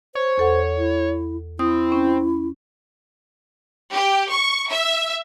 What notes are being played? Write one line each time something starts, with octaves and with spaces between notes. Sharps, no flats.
C5 C#5
E2 A4 F#5
E4
C4 E4 D#6
C#4
G4
C#6
E5